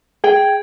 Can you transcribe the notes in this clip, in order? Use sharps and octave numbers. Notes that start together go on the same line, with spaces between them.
G#4 G5